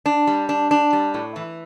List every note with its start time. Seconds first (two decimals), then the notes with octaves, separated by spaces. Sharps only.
0.06 D4
0.27 G3
0.49 D4
0.71 D4
0.93 G3
1.14 A2
1.36 E3